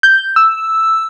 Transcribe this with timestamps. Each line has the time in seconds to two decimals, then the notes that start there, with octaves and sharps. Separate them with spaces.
0.03 G6
0.36 E6